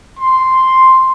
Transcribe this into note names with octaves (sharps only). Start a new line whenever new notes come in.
C6